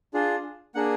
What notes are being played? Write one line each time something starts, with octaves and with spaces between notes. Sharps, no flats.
D4 F4 G#4
A#3 D4 G#4 F#5